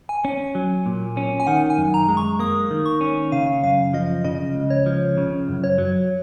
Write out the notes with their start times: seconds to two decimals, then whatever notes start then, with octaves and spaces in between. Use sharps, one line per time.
0.09 G#5
0.25 C#4
0.55 F#3
0.86 A#2
1.17 C#4
1.40 G#5
1.47 D#3 F#5
1.70 G#5
1.78 F#2
1.94 A#5
2.09 G#3
2.17 C#6
2.39 A#3 D#6
2.71 D#3
2.86 C#6
3.01 C#4
3.32 C#3 F5
3.63 F#2 F5
3.93 F3 D#5
4.25 C#3 D#5
4.55 C#2
4.70 C#5
4.86 F3
5.17 C#3
5.48 F#2
5.64 C#5
5.78 F#3